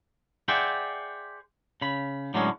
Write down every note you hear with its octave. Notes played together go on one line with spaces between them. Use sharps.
G#4 C5 D5 E5 F#5 G5
C#3 B5
A2 D3 F#3 G#3 B3 C#4